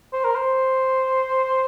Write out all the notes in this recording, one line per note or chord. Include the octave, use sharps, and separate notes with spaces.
C5
A#4
C5